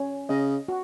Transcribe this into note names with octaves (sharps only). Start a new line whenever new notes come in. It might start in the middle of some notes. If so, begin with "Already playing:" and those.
Already playing: C#4
C#3 D#5
F#4